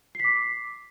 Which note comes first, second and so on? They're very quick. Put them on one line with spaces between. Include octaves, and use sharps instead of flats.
C7 B6 D6